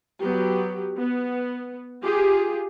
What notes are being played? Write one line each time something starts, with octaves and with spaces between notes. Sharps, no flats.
F#3 B3 G4
B3
F4 G4 G#4